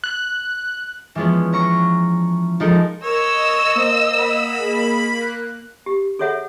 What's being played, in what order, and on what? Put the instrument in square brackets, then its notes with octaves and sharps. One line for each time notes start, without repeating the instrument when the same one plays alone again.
[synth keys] F#6
[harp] E3 F3 G#3 B3 C#4
C#4 A#5 C#6
F3 G#3 D#4 A4 A#4
[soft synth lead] A#4 [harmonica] C#5 [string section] D#5 E6
[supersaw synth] A#3 [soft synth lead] C5
[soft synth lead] F#5 [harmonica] B5
[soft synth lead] G#4
F#6
[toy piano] G4
G#4 A4 C#5 E5 F#5